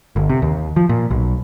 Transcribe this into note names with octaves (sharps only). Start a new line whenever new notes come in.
G1
C3
D#2
F3
A#2
B1